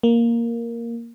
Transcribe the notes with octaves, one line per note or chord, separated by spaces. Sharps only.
A#3